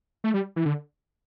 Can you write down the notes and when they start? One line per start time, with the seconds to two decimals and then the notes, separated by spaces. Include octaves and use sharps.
0.24 A3
0.34 G3
0.56 E3
0.66 D3